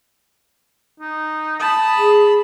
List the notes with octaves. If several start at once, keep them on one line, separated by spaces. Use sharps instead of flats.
D#4
A5 B5 D#6
G#4